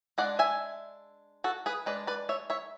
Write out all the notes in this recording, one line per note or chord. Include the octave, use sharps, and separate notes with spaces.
G#3 D4 D5 F#5
E5 G#5
F#4 A4
G#4 B4
G#3 D4 B4 D5
B4 D5
C#5 E5
C#5 E5